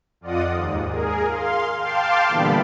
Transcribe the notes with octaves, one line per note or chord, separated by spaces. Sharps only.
F2 F4 D5 D#5 F#5 D#6
D#2 G#2
G#4 A#4
F5 C6
F5 G5 A5 C6 D6
A#2 D3 E3 G3 B3 B5